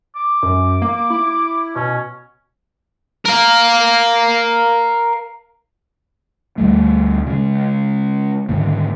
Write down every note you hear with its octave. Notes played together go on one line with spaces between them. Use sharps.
D6
F#2
A#3
E4
B2 C#4
A#4 F5
D2 G3 A3
C#3 G#3
G#2 D3 D#3 A#3